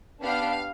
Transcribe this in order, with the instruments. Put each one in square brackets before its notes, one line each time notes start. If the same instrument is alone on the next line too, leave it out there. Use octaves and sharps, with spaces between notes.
[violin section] B3 D4 G4 F5